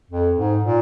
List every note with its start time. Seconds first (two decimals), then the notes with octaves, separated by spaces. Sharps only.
0.10 F2
0.37 G#2
0.64 A#2